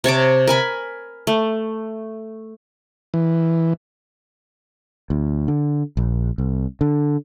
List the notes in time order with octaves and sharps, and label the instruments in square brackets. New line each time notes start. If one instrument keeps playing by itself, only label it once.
[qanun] C3 C#5 A5 D6
A#4 G#5 B5
A3
[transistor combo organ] E3
[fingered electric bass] D2
D3
A#1
C2
D3